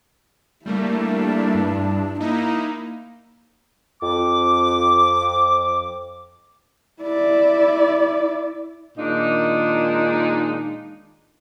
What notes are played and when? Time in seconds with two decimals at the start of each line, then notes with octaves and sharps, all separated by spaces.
0.66 G3 A3 A#3 D4 E4
1.55 G2
2.21 A#3 D#4 E4
4.01 F2 D6
7.03 E4 D5
8.98 A#2 D#3 G#3 D4 D#4